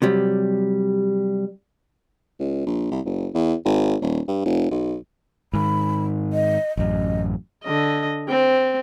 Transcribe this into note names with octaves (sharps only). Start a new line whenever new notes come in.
C3 F#3 G3
C#2
A#1
C2
F#1
E2
G#1
D#1
G2
F1
B1
G#2 D#3 B5
D#5
A1 F#2 D#5
D3 D#5
C4